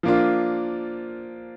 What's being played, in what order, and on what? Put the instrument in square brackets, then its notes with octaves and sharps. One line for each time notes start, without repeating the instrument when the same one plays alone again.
[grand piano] F3 A#3 D4 F4